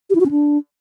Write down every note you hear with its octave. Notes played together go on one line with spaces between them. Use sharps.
G4
E4
F#4
C#4
D4